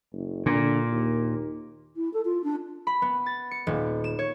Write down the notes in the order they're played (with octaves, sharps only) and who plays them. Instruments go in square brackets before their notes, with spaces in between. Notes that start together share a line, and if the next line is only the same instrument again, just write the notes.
[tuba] F#1
[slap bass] A#2 [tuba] D3
[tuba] D#2
[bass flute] E4
A4
F4
D4
[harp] B5
B3
A6
C#7
D#1
E7
C#5